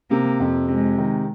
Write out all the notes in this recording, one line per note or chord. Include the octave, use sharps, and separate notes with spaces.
C3 A#3
F2
C3 G#3
D#3